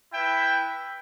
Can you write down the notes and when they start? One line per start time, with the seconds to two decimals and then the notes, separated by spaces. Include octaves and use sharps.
0.13 E4 B4 E5 G5